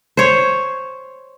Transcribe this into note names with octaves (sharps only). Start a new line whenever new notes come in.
C5 C#5